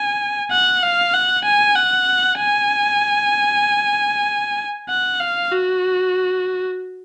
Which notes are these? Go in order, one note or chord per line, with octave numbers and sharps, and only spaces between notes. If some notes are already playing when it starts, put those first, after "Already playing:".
Already playing: G#5
F#5
F5
F#5
G#5
F#5
G#5
F#5
F5
F#4